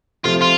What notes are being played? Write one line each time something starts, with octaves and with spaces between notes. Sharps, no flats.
C3 F3 A3 F4
F4